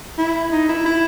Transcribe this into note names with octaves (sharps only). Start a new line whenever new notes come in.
E4
D#4
E4
E4